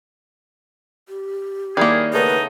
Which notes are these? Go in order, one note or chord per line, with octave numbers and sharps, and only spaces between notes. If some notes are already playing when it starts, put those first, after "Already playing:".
G4
D#3 G3 A#3 E4 G#4 C#5
C#3 A3 B3 D#4 B4